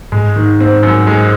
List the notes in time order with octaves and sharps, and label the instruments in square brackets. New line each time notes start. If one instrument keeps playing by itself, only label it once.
[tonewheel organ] G#2 [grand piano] G#3
[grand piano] D#3
C4
F#2
G#3